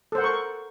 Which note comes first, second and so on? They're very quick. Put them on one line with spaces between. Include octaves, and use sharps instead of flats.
A4 C5 F#5 A#4 C#6